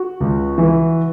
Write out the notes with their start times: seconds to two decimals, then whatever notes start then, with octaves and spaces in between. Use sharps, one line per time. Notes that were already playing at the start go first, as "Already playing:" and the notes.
Already playing: F#4
0.20 C#2
0.58 E3